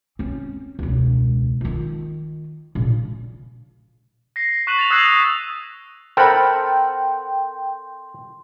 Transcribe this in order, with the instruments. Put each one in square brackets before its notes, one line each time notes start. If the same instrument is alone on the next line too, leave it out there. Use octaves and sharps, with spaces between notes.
[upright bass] C4 C#4
E1 C#2
D#3 F4
A#2 C#3
[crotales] A#6 C7
A#6
C#6 F#6 B6 D#7 E7 F#7
A6 E7 F7
D#6 E6 F#6 G#6 A#6 C7
F#6 A#6
[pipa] C4 B5 [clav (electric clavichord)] A4 A#4 F#5 [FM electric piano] G5 [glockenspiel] C6